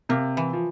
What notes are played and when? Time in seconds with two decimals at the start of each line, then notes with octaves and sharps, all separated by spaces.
0.09 C3 A#3
0.37 E3
0.53 F3